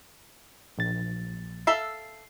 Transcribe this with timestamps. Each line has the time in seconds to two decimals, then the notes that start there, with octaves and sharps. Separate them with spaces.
0.78 A#1 A6
1.67 A4 E5 F5 C7